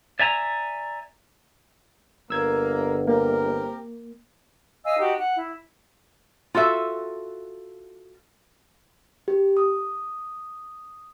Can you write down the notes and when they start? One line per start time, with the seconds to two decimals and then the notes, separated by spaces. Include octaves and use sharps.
0.19 D5 E5 G#5 A#5
2.30 G1 A#3 E6 G#6
3.07 C3 A#3 G4 A#4
4.84 D#5 F5 G#5 E6
4.98 D#4 F#4 G4
5.20 F#5
5.35 E4
6.54 F4 F#4 A4 E5
9.28 G4
9.57 D#6